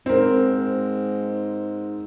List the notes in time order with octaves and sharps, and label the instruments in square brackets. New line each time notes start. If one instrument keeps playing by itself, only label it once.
[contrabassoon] G#2 [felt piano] C4 A#4